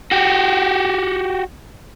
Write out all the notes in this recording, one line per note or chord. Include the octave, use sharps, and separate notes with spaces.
F#4 G4